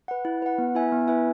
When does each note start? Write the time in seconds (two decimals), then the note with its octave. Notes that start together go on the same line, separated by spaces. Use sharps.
0.08 B4 F#5
0.25 E4
0.42 B4 F#5
0.58 B3
0.75 E4 B4 E5 G#5
0.92 B3
1.07 E4 B4 E5 G#5